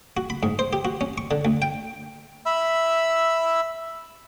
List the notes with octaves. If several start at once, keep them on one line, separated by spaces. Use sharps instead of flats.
F#4
B5
G#2
C5
G4
F#4
C#4
C#6
D3
D2
G5
E5 B5 E6